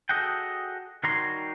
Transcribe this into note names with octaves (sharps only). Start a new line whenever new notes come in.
F#4 G#4 A4 D#5 F#5 G5
D#3 G3 F#4 C#5 A#5 C6